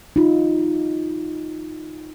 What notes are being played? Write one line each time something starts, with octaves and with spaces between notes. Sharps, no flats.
D#4 F4